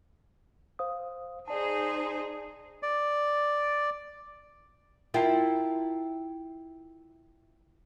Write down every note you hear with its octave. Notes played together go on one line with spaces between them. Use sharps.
C5 F5 D#6
D#4 G#4 C5 D5 A5
D5
E4 F4 A#4 G5 A5